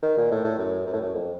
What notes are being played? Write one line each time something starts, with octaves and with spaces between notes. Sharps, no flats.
D#3
A#2
A2
A2
F#2
F#2
A2
F#2
F2